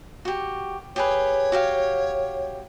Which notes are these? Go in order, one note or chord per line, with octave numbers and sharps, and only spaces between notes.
F#4 G4
G4 G#4 B4 C#5
F#4 G4 F5